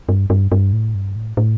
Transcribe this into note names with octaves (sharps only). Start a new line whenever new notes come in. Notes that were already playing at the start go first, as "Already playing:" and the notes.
G2
G2
G2
A2
G2
A2
A2